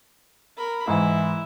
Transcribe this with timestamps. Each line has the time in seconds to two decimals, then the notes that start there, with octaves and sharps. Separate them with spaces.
0.57 A#4 B5
0.88 G#2 E3 E4